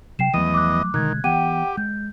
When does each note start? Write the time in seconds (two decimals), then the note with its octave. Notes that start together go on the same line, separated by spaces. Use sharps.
0.19 C3 F#3 G5 C7 E7
0.34 E2 F3 F#3 A3 D#5 D#7
0.54 D6 F#6
0.94 B2 D3 D#3 G#3 F#6 G#6
1.24 E3 B3 G4 F#5 G5 D#7
1.77 G#3 G6